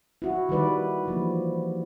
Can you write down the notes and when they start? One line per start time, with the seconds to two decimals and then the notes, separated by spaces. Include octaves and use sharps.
0.22 E4 F#4
0.49 D#3 G3 B4 D5
1.06 E3 F3 A#3